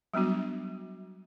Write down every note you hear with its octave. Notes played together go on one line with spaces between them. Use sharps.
F#3 G3 B3 D4 F#4